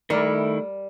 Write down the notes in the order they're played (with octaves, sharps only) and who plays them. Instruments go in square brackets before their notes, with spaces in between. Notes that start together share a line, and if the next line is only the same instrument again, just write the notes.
[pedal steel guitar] D#3 E4 [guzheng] G3 [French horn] A3 [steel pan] A#4 D5